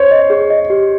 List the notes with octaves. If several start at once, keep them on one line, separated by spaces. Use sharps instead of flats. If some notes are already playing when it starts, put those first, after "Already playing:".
Already playing: C5 C#5
D#5
G#4
D#5
G4